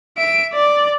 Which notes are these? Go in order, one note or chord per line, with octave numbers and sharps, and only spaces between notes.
E5 D7
D5